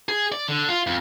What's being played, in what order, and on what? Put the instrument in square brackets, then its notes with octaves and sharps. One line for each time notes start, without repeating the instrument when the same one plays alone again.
[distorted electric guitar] G#4
D5
D3
F4
F2